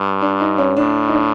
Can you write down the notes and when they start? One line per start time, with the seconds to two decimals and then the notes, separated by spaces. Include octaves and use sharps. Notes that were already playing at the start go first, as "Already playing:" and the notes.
Already playing: G2
0.21 D4
0.40 D#4
0.58 C#4
0.77 A2 D4
1.08 D#4
1.14 D4